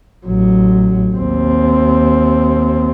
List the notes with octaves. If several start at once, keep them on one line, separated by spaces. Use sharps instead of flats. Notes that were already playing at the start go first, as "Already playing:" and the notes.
A1 F#3
D#2 C4